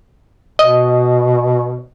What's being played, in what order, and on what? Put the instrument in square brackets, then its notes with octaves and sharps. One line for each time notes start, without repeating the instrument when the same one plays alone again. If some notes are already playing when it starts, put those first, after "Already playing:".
[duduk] B2 [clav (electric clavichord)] D#5